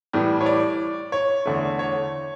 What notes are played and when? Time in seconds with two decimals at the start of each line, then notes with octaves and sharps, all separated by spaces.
0.13 A2 E3 G3
0.41 C#5
0.46 D5
1.12 C#5
1.46 E2 D3 A3
1.79 C#5